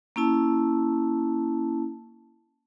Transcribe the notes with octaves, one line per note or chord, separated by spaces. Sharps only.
A#3 C#4 E4 A5